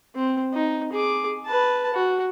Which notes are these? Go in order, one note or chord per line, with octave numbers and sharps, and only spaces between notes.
C4
D#4
G#4 D6
B4 A5
F#4